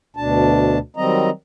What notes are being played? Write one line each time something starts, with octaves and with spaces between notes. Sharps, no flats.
D2 B2 D4 A5
D#3 F#3 G3 C4 D#5 A#5